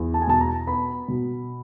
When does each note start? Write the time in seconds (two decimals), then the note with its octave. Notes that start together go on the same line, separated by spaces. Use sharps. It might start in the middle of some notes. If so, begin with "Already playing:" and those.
Already playing: E2
0.14 A5
0.22 G#5
0.27 B2 A5
0.41 A#5
0.67 B3 B5
1.08 B2